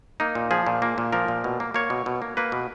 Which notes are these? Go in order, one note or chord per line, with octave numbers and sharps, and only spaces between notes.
A#3 D#4
A#2
F3 G#4
A#2
A#3
A#2
F3 A#4
A#2
B2
A#3
A#3 C#5
B2
B2
A#3
A#3 B4
B2